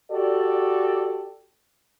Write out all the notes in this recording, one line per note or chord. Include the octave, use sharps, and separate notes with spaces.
F#4 G4 A4 D5